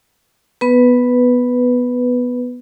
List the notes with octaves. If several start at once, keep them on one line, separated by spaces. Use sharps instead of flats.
B3 B4